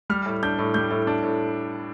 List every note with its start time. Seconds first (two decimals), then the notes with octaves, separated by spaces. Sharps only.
0.10 G3 F6
0.26 A2
0.43 D4 G6
0.59 A2
0.74 G3 G6
0.91 A2
1.07 D4
1.23 A2